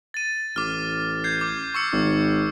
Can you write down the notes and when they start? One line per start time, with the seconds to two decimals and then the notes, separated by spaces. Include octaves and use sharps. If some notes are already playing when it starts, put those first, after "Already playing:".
0.14 A6 D#7
0.56 A1 D6 F6
1.24 G6 G#6 C7
1.41 D6 F6 C7
1.74 C#6 E6 C#7
1.93 G#1